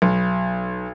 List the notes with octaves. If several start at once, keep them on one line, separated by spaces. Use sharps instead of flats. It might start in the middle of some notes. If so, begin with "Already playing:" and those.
B1